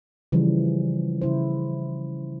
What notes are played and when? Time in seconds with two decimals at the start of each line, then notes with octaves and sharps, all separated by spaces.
0.32 C#3 E3 F3 G3
1.21 C#3 E4 C5